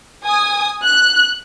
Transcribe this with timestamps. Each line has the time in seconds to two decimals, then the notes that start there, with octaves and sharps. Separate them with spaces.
0.24 G#5 D#6
0.83 F#6